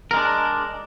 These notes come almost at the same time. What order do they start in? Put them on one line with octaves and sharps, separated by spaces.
A#4 G#3 D4